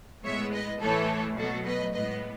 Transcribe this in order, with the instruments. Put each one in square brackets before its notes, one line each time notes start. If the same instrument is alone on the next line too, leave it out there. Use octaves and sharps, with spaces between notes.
[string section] A2 G#3 B3 C#5 E5
B4 D#5
A2 E3 A3 A4 C#5
B2 F#3 A3 F#4 A4
B4 D#5
A2 G#3 B3 B4 D#5